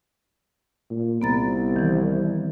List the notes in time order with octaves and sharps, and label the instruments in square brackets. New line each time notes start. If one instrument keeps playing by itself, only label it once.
[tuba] A#2
[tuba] C2 [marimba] B3 A#5 A6
[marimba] D#3 E3